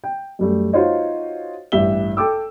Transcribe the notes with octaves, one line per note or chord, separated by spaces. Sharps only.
G5
F#2 G3 A3
D#4 F4 F#4 C5 C#5 D#5
A1 G2 G4 E5 G7
A4 G5 D6 E6